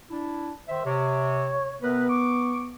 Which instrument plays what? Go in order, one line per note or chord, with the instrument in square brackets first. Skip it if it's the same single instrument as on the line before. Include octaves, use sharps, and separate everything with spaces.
[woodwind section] D4 E4
[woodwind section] D#3 E5 [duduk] C5
[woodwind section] C3 [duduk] C#5
[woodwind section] C3 A#4 B4 [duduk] B3
[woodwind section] C#6 D6